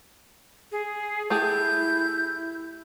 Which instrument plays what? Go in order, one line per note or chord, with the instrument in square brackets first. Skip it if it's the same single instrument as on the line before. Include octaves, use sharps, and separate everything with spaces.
[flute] G#4
[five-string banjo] A3 G4 G#4 [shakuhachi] E4 [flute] G6